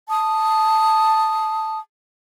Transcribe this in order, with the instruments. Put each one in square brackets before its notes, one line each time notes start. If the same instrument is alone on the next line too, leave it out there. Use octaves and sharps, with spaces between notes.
[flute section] A5 D#6